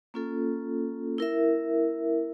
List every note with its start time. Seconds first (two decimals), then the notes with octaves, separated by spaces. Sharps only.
0.14 A#3 C#4 F4 A4
1.18 E4 A#4 E5